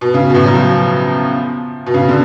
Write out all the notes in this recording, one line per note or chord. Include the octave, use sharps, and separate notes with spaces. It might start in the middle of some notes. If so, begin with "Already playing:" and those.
B2
C#3
B2
A2
F#3
F3
B2
C#3
D3